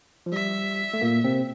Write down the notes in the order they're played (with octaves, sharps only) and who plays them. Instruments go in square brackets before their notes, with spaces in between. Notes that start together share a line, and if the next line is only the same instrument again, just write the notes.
[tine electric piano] F3
[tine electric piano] G3 [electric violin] E5
[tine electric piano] A3
A#2 A#3
C3 C4